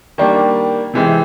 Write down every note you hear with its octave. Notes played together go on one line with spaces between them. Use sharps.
D#3 G3 A#3 D4
C3 E3 G#3 C4